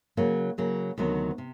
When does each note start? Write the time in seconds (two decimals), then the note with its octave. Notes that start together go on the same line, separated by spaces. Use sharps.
0.17 C#3 F#3 A#3
0.58 C#3 F#3 A#3
0.98 D2 C3 D#3 F#3 B3
1.38 C3